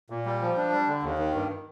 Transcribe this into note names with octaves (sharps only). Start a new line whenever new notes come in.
A#2
G3
F3
D4
G3
D3
D#2
D#3
G2